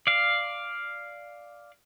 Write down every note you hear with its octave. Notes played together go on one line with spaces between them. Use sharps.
D5 F5